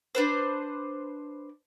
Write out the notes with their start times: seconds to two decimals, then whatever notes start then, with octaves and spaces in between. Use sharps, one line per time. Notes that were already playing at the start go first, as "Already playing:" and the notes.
0.15 D4 B4 C5